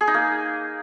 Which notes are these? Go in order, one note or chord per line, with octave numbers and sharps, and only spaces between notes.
G#4
D#4
A#3